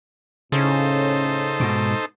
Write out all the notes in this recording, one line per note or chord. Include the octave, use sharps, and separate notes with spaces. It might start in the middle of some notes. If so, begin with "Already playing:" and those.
A2 C#3 C#4 D#4 A4 C5
G#2 B2